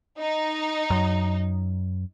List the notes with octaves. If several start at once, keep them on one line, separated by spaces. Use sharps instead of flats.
D#4
F#2